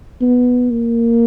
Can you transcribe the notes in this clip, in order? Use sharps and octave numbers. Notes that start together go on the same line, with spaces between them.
B3
A#3